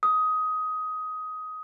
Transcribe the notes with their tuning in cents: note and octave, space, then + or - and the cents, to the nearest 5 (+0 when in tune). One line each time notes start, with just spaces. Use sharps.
D#6 +15